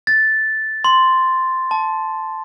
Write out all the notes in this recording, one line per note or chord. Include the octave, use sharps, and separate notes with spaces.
A6
C6
A5